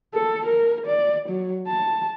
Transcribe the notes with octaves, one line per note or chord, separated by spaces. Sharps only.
A4
A#4
D5
F#3
A5